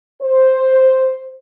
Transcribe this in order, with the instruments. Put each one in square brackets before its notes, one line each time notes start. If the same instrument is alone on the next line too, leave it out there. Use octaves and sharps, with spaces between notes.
[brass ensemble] C5